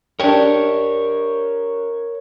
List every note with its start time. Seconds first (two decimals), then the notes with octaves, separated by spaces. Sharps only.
0.20 D4 G4 A#4 C#5